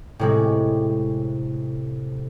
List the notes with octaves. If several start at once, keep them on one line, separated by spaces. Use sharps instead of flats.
A2 C3 G#3